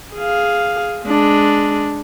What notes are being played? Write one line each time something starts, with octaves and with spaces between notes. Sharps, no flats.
G#4 F5
G#3 D4